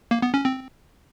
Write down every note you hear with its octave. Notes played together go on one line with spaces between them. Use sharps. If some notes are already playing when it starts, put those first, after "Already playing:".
A#3
B3
C#4
C4